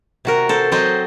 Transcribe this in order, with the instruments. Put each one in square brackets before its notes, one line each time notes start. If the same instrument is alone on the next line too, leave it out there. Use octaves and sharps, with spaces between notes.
[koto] C3 F#4 A#4
A4 C5
F#3 C4 C5 D#5